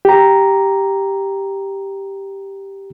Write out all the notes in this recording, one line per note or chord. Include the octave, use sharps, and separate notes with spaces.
G4 A#5